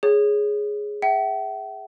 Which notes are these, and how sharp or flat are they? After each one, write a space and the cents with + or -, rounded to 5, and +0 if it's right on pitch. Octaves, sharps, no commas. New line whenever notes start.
G#4 +0 C#5 +0
E5 +5 G5 -45